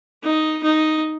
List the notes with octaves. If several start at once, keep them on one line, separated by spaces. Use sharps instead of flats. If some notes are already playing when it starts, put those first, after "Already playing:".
D#4
D#4